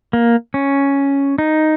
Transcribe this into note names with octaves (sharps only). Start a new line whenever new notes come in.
A#3
C#4
D#4